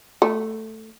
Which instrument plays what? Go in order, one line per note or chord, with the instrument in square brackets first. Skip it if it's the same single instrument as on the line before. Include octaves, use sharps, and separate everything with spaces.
[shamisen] A3